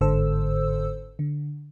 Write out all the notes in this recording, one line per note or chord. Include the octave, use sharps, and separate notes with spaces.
G1 G#2 D3 A4 C5 E6
D3